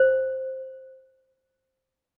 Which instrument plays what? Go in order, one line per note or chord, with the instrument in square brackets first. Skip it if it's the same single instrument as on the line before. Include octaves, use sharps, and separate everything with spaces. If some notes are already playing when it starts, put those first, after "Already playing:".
Already playing: [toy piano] C5